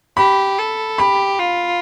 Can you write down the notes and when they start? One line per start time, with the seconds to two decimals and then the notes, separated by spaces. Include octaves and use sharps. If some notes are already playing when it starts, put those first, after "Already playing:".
0.17 G4 B5
0.58 A4
0.98 G4 B5
1.39 F4